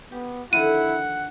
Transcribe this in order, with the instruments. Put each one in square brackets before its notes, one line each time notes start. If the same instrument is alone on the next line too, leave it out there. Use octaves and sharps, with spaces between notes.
[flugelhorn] B3 [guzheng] G4
[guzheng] D3 D#3 F3 [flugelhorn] E4 [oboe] F#5 [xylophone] D#7